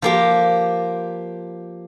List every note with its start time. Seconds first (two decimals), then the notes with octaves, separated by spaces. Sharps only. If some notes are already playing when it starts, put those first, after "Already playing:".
0.02 F3 A#3 G4